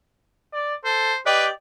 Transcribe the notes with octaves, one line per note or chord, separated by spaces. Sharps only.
D5
A4 C5
G4 B4 D5 D#5 G5